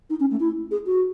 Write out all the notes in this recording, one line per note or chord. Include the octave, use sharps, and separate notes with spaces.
D#4
C#4
A3
E4
G#4
F#4